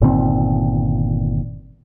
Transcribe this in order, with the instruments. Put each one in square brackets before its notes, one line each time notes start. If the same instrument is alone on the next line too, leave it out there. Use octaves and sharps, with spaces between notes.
[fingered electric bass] G1 A#2 D#3 C4